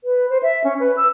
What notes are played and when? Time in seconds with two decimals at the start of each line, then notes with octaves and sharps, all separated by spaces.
0.04 B4
0.30 C5
0.43 E5
0.64 C#4
0.80 B4
0.97 E6